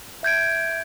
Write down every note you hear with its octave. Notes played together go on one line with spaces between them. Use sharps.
E5 G6 G#6 D7